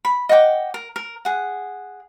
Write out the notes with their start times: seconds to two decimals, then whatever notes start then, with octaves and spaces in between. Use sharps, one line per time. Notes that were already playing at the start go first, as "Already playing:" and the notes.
0.05 B5
0.29 D#5 F#5 G5 D6
0.74 A#4
0.96 A#4
1.25 G#4 F#5